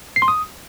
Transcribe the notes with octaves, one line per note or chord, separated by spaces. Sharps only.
C7
C6
D#6